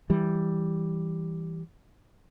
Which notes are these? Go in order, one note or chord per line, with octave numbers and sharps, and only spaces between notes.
E3 G3